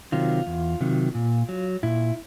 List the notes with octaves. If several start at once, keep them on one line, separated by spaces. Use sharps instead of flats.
C3 D#3 F#3 F4
E2
C3 D#3 F#3
A#2
F#3
A#2 E4